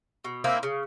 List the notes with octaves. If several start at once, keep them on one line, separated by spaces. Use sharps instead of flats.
B2
A#3 C4 D#4 E4
C#3